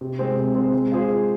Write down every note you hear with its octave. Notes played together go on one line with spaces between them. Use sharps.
C3
G#3 C4 G#4 C5
C3
G#3 C4 G#4 C5
G#3
F4 G#4 C5
G#3